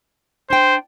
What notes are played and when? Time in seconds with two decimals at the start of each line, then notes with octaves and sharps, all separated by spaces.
0.50 D4 C5 G5